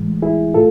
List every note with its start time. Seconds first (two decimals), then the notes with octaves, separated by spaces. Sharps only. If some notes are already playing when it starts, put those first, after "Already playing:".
Already playing: A2 E3 G#3
0.22 E4 G#4
0.54 A2 F4 A4